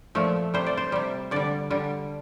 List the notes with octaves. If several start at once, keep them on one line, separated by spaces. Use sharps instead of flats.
A#2 F3 A3
C3 G3 C5
D5
C5
C3 G3
D3 G3 D5
D3 G3